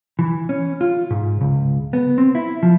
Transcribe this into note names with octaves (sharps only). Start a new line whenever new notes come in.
E3
C#4
F4
G#2
C#2
B3
C4
E4
F3